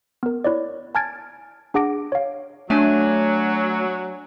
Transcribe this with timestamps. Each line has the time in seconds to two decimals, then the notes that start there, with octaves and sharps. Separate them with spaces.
0.23 B3 A#4
0.44 E4 C#5 D5
0.95 G#5 A5 F6 G#6 A6 D7
1.74 D4 G#4 F#5 D6 A#6 D7
2.12 C#5 F5
2.70 F#3 A3 D4 G#5